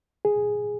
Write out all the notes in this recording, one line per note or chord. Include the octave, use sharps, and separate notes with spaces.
G#4